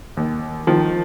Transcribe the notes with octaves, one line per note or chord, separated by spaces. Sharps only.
D#2
D#3 F3